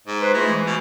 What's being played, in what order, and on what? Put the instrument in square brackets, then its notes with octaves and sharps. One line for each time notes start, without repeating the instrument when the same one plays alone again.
[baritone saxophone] G#2
[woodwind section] B4 C5
[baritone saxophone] G#3 [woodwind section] A3 E4 F4
[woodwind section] E3
[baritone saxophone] B2